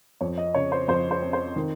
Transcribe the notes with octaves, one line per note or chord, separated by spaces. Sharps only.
F2 C#5
D#5
C#3 C#5
C5
F2 C5
C5
C4
C5
D#3